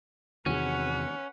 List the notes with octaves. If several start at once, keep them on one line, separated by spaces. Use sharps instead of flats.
E2 C3 D#3 C#4 F#4 G#4 B4 F#5